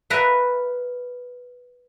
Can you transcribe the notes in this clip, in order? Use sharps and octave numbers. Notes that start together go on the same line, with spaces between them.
A#4 B4 E5 A#5